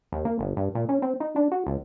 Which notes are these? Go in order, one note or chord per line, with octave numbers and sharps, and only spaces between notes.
D#2
A#3
G1
G2
A#2
C#4
C4
D#4
D4
F#4
C#2